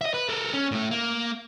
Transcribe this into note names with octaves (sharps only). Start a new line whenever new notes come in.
D#5 E5
B4
A4 A#4
C#4
A2 A3
A#3